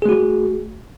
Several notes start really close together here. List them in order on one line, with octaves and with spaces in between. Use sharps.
G#4 A3 F#4